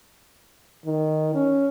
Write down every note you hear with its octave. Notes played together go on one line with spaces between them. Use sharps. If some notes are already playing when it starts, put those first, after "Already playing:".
D#3
C#4